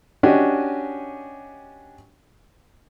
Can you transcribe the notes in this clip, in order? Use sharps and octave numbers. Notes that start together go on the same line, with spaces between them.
C#4 D4 F#4 G4 D#5